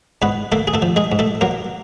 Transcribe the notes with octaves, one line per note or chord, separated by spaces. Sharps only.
G#2 B3 B4
A3 A#3 A4
G#4
A3 A4
F3
G#3 G#4
G#2
A3 A4
F#3 A#3 A#4